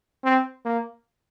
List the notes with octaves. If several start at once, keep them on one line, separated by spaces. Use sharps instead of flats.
C4
A#3